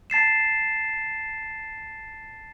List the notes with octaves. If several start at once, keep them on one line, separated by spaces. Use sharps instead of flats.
A5 A6 C7 E7